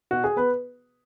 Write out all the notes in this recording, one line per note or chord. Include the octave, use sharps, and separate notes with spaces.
B2 F#4
G#4
B3 B4